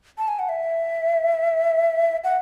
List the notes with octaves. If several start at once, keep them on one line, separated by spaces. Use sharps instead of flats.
A5
G#5
F#5
E5
F#5